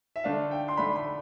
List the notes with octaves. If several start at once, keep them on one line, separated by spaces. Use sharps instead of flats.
E5
D3 A3 D4 F5
G5
C6
D3 A3 D4 B5
B5